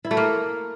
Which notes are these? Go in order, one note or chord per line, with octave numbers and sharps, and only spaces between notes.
E4
A3
A#3